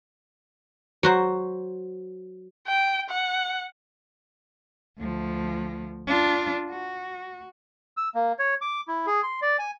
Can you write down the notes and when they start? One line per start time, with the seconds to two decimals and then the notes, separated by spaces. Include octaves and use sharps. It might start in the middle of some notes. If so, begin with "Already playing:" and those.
1.03 F#3 F#4 C5
2.68 G5
3.10 F#5
4.99 D2 F3
6.07 D4 F4
6.71 F#4
7.97 E6
8.15 A#3
8.39 C#5
8.62 D6
8.88 E4
9.07 G#4
9.23 C6
9.42 D5
9.59 G#5